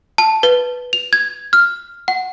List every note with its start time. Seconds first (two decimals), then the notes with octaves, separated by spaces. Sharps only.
0.18 A5
0.43 B4
0.93 F7
1.13 G#6
1.53 F6
2.08 F#5